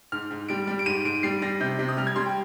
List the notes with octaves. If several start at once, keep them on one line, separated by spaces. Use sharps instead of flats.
G#2 F6
G#2
G3 D7
G3
D7
G#2 D#7
G#2 D7
G3 C7
G3 A#6
C3 G6
C3
D#6
G3 F6
G#6
G3 C6
G5